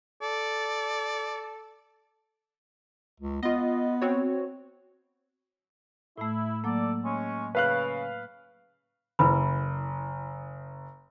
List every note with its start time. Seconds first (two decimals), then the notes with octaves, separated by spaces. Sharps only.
0.22 A4 D5
3.20 C#2
3.43 B3 F4 D#5
4.02 C4 F#4 C#5
6.18 A2 A3 E4
6.64 F#3 A#3 A4 D5
7.04 G#3 C#4
7.55 C#3 B4 F5 F#6
9.19 F#1 E4 B4 B5